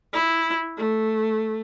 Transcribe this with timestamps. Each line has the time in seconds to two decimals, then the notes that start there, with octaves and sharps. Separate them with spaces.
0.13 E4
0.77 A3